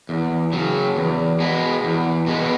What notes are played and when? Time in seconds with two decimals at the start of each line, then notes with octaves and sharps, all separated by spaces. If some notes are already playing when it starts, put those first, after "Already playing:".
0.09 E2
0.52 C#3 F#3
0.97 E2
1.40 B2 G#3 B3
1.84 E2
2.26 B2 G#3 B3